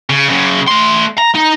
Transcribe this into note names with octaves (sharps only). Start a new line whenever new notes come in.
C#3
F#2 C#3
A3 C6
A#5
D#4